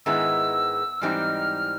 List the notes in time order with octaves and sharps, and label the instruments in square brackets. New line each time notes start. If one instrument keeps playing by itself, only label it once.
[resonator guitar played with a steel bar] G#2 D#3 G#3 B3 E4 [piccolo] E6
[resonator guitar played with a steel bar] G#2 E3 G3 C4 D#4 [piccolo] F6